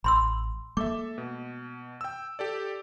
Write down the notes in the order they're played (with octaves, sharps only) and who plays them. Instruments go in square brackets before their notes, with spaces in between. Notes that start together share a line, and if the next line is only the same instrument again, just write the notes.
[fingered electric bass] A1 [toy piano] B5 C6 E6
[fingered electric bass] G#3 A#3 [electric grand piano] A4 E5 [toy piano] D6
[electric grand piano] B2
G5 E6
G4 A4 D5